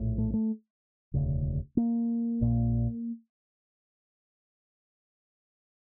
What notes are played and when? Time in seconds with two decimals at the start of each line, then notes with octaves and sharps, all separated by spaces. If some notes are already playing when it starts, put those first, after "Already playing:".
Already playing: A#1 A2
0.18 A3
0.34 A3
1.14 E1 D2 C#3
1.77 A#3
2.41 A#1 A#2